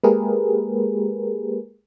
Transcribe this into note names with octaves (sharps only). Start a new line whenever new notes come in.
G#3 A#3 G4 G#4 A#4 B4